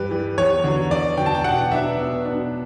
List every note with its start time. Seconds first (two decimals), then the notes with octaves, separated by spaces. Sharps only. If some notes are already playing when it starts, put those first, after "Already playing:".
Already playing: G2 E3 G3 B4
0.11 E3 G3
0.38 E2 C#5
0.64 D3 F#3
0.90 E2 D5
1.17 D3 F#3 G5
1.26 A5
1.35 G5
1.44 B2 F#5
1.71 F#3 B3 D4 E5
1.97 B2
2.25 F#3 B3 D4